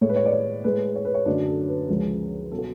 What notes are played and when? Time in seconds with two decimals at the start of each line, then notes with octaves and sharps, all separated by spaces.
0.01 A2 G#3 C#5
0.09 B4
0.16 C#5
0.25 D5
0.33 C#5
0.64 A2 G#3 B4
0.95 C#5
1.05 B4
1.14 C#5
1.26 F#2 D3 F#3 A3 D4
1.47 A4
1.68 B4
1.89 C#2 C#3 F3 G#3
2.52 B2 F#3 A4
2.58 F#4